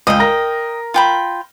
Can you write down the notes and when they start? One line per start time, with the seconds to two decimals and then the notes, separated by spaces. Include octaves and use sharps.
0.07 C#2 D#5 G5
0.20 A#4 A#6
0.94 F4 G5 B5